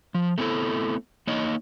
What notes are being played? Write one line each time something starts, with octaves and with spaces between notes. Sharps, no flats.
F3
A3 B3 C4 E4 A4
A#3 D#4 C#5 D#5